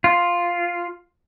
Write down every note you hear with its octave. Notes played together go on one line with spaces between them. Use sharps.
F4